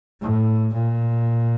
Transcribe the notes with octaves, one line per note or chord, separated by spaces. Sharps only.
A2
A#2